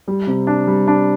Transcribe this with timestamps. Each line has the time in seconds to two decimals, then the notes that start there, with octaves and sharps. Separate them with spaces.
0.08 G3
0.27 C3
0.47 D4
0.67 G3
0.87 D4